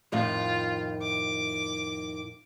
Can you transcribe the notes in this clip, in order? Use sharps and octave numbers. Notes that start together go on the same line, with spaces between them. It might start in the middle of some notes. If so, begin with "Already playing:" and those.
F2 A2 D#3 F4
D6